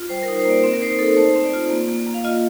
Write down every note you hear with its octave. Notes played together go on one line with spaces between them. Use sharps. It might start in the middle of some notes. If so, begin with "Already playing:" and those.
Already playing: F4
G3 C5
A#4
D#4
C5
A#3 D5
C4 D5
A#4
D#4 C5
D#4 A4
A3 C5
C4
D5
F4
A#3
A#3
A#3
F5
F4 D#5